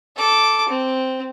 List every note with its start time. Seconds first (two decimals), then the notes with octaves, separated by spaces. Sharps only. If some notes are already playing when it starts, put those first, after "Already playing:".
0.17 A4 D6
0.69 C4